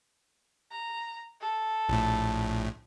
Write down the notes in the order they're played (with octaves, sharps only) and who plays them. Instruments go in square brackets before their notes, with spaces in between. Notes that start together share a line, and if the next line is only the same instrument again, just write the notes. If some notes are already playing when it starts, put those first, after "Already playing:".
[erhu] A#5
A4
[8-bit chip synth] A#1 A2